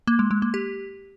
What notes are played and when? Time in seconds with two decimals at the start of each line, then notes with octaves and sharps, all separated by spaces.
0.07 A#3
0.19 G#3
0.31 G#3
0.42 A#3
0.54 G4